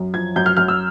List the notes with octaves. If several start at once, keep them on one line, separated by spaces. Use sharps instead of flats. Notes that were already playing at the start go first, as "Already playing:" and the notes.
Already playing: F#2
F3 G#6
F#2 G6
F6
F#2 F6
E6